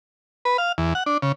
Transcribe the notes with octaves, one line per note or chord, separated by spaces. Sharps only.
B4
F5
E2
F#5
D4
C#3